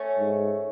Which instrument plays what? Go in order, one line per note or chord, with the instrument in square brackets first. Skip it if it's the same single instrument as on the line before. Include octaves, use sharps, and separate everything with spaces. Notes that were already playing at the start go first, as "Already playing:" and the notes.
Already playing: [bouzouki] A3 C#4
[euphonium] G#2